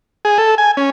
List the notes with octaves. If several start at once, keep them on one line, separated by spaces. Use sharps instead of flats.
G#4
A4
G#5
C#4